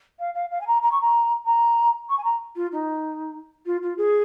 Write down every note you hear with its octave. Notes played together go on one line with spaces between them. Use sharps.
F5
F5
F5
G#5
A#5
A#5
C#6
A#5
A#5
C#6
G#5
A#5
F4
D#4
F4
F4
G#4